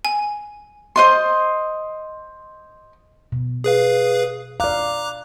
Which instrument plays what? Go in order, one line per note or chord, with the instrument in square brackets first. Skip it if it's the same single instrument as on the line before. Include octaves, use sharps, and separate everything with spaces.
[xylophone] G#5
[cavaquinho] C5 D#5 C6
[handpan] B2
[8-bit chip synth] G#4 B4 F5
[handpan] D5 F5 [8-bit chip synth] A#5 D6 F#6